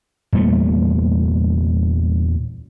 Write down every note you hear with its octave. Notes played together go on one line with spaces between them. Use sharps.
E2 A#2 G3 A3